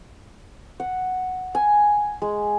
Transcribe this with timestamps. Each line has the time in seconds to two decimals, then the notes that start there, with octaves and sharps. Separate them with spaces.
0.80 F#5
1.55 G#5
2.22 G#3